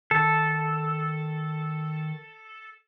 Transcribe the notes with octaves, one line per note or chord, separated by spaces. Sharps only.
D#3 A4